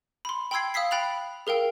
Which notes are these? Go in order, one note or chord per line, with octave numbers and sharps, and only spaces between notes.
B5 C6
G5 B5 C6 E6 G#6 C7
F5 D#6 E6 B6 C7
G5 B5 F#6 A6 F7 F#7
G#4 A#4 F5 G5 E6